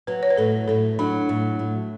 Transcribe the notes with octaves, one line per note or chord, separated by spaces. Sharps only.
F#3 B4
C#5
B4
A2 A4
A2 A4
F#3 D4
A2
A2